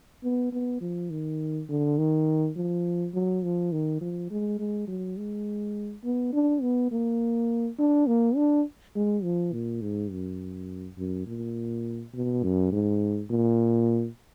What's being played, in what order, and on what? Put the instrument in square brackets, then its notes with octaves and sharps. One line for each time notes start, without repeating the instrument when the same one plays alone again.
[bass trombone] B3
B3
F3
D#3
D3
D#3
F3
F#3
F3
D#3
F3
G#3
G#3
F#3
G#3
B3
D4
B3
A#3
D4
A#3
D4
G#3
F3
A#2
G#2
F#2
F#2
A#2
B2
F#2
G#2
A#2